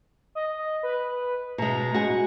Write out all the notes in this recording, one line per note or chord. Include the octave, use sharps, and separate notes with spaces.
D#5
B4
B2 G#3 A#5
G#3 F#4 G#5